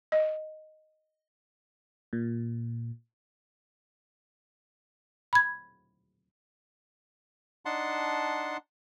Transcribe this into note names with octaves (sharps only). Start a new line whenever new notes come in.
D#5
A#2
B5 G#6
D4 D#4 F#5 A5 C6